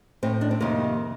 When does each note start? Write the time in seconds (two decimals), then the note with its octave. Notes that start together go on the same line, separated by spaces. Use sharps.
0.23 A2 C4
0.41 D4
0.51 C4
0.60 F2 C3 D#3 A#3